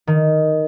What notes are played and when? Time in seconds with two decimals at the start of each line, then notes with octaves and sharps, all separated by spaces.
0.07 D#3